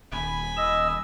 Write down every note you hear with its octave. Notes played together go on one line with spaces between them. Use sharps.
D#1 G#5 B5
D#5 E6